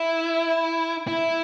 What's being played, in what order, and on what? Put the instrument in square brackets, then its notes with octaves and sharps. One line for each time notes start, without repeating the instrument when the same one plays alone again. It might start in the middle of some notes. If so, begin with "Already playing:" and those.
Already playing: [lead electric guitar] E4
E4